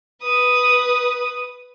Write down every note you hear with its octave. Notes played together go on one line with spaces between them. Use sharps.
B4 D#6